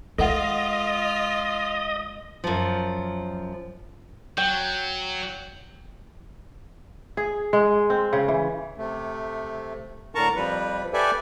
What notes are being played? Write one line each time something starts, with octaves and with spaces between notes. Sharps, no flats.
G#3 F4 A4 D#5 E5 F#5
F#2 F3
F#3 G5
G#4
G#3
C4
C#3
E3
C3 A3
A2 D3 A#4 A5 A#5 C#6
F2 F3 G3 B4
G4 A4 B4 D5 E5 G#5